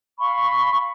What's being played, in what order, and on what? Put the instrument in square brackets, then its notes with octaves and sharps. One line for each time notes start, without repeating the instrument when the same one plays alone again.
[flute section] F5 B5 C#6